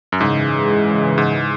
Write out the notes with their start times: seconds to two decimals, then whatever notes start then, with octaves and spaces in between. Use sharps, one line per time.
0.12 F#2
0.21 G#2 C#3 E3 G#3
1.18 G#2